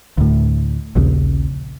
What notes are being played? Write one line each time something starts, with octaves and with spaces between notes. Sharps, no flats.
D2 A2
A#1 D#2 C#3